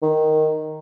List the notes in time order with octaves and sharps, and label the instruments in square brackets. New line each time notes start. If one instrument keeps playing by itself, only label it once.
[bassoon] D#3